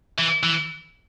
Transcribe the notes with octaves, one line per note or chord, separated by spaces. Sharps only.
E3
E3